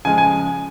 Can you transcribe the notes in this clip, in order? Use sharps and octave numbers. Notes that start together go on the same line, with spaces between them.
C#3 F3 G#3 G#5
G#5